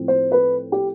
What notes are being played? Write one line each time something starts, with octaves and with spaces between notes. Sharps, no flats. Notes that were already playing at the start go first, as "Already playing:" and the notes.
Already playing: A2 F3 C4
C5
B4
G4